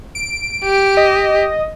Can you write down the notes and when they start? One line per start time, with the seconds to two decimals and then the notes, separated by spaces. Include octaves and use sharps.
0.15 D7
0.64 G4
0.97 D#5